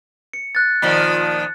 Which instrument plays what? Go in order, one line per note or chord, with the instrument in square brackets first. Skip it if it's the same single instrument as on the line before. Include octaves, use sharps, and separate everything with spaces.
[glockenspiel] C#7
F#6 A6
[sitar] A#2 D#3 F3